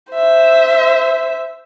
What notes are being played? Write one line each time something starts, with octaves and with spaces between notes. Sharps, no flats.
C5 E5